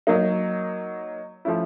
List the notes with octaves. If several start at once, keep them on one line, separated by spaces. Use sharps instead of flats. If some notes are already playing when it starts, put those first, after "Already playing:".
F#3 A#3 D#4
F3 A3 C#4 E4